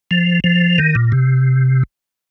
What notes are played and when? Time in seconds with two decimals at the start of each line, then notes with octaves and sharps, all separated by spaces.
0.11 F3
0.44 F3
0.78 D#3
0.95 A#2
1.12 C3